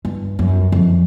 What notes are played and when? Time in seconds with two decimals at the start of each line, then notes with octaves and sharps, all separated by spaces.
0.05 G2
0.39 F#2
0.72 F2